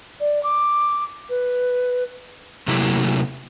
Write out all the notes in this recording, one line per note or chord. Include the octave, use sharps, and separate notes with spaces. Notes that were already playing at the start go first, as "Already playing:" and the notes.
D5
D6
B4
C3 F#3 A3 A#3 E4 G4